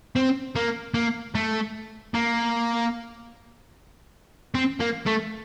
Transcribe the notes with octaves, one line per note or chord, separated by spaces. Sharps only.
C4
A#3
A#3
A3
A#3
C4
A#3
A3